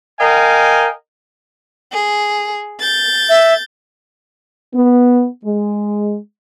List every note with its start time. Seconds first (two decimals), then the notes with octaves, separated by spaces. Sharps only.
0.19 A#4 D#5 F5 G5 G#5
1.92 G#4
2.80 G6 A6
3.29 E5
4.74 B3
5.45 G#3